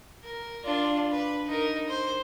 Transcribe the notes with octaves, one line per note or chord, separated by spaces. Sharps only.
A#4
D4 F4
B4
D#4 A#4
C5